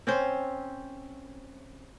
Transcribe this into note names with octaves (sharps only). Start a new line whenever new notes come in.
C4 C#4 C5